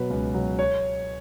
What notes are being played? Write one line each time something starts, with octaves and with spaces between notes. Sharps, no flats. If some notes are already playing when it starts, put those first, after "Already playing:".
Already playing: B2 F#3 B4
C#2
B2 F#3
C#5